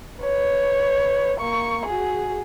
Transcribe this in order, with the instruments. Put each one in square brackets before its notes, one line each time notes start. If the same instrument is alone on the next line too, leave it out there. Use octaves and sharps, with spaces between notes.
[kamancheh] B4 C#5
A#3 C#6
F#4 G#4